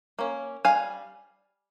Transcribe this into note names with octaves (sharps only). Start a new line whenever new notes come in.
A#3 C#4
G3 F5 G#5